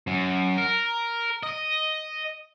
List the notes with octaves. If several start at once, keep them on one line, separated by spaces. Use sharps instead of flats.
F#2
A#4
D#5